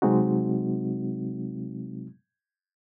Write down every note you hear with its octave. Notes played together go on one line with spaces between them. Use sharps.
C3 F#3 G#3 C4 D#4 F#4